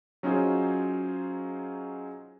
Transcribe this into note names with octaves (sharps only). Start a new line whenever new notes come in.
F#3 C#4 D#4 F4 G#4 C5